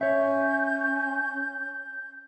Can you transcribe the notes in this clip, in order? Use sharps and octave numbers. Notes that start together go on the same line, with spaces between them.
C#4 C#5 E5 G6